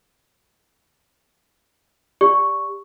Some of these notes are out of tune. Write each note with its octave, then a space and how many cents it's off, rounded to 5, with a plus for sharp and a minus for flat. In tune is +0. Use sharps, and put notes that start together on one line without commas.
G4 +20 D5 -15 C#6 +0